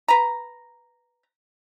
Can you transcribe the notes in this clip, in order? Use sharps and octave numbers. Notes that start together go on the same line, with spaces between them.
B4 A#5